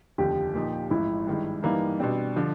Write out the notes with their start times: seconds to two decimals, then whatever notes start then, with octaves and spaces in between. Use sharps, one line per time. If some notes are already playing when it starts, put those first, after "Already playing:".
0.18 F1 D#2 D3 F3 G4
0.54 A#2 F3 A#3 D#4
0.91 A1 G#2 F3 E4
1.27 G2 D#3 G#3
1.63 G2 E3 G3 A#3 D#4
1.99 B2 G3 C4 D4
2.36 D3 F3